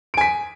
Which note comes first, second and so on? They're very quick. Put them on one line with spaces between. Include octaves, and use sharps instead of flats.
D7 G#5 B6